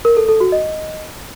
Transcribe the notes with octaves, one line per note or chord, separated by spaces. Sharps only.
A#4
A4
A4
F#4
D#5